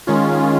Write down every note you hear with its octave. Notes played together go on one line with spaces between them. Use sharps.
D#3 G#3 C#4 F4